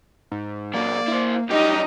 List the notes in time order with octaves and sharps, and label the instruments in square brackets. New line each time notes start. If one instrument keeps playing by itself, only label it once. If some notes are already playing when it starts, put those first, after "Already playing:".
[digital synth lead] G#2
[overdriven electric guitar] A#2 F#3 [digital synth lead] A#3 [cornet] D5
[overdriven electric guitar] E4 C5
[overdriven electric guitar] F#2 G3 [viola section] D#4 D#5 A#5 [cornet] G4